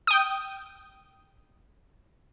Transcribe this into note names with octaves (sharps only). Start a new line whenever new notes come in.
G5 D#6